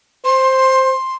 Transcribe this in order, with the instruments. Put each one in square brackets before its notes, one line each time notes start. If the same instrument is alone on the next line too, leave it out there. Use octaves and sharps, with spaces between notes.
[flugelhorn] C5 [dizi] C6